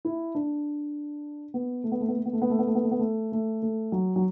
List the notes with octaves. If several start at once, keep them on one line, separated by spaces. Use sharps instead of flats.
E4
D4
B3
A3
B3
A3
B3
A3
B3
A3
B3
A3
B3
A3
B3
A3
B3
A3
A3
A3
F#3
F#3